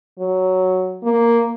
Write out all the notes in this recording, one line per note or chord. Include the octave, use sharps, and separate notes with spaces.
F#3
A#3